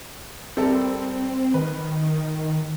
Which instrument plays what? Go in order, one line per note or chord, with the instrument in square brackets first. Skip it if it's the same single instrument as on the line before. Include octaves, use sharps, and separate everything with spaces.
[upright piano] G3 A4 A#4 [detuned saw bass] C4
[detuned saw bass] D#3 [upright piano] B4